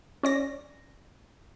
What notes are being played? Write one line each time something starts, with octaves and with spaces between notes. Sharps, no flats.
C#4 D5 A#6